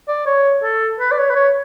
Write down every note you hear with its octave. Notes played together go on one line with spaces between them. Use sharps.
D5
C#5
A4
B4
D5
C#5
B4
C#5